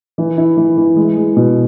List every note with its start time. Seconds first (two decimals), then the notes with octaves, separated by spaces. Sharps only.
0.18 E3
0.38 E4
0.57 E3
0.78 E3
0.96 G#3
1.17 G#3
1.37 B2